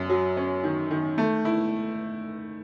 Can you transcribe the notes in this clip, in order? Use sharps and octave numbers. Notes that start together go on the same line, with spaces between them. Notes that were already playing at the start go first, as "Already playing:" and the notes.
Already playing: F#2
F#3
C#4
D#3
D#3
A3
E4